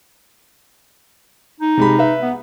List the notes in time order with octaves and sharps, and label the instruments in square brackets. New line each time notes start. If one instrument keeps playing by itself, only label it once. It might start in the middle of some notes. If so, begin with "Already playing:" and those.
[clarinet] D#4
[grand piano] C3 G#3 B5
B4 E5
[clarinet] B3